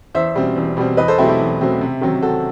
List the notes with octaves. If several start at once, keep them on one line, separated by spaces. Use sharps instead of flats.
E2 C5 E5
B2 G3 C4
E2
B2 G3 C4
E2 B4 D#5
A4 C5
B2 F#3 A3 C4 E4 G4
E4 G4
E2
B2 F#3 A3 C4
C3
D#3 F#3 C4
C3 F#4 A4